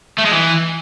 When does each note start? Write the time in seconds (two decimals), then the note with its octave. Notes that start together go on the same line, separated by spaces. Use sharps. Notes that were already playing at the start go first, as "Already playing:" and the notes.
0.18 A3
0.25 G#3
0.32 E3